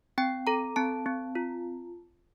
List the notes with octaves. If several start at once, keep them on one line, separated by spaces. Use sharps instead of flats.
C4 G5
A4 A#5
C4 A5
C4
F4